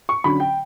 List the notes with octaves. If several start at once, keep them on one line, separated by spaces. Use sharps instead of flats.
C#6
D3 F#3 C#4 B5
G5